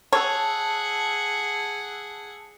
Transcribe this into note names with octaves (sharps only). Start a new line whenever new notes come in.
G#4 C#5 F#5 A5 E6